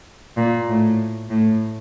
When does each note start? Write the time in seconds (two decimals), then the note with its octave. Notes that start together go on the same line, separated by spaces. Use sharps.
0.36 A#2
0.68 A2
1.29 A2